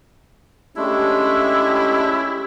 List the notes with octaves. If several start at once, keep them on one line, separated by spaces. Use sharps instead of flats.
G#3 A3 C#4 D4 E4 G4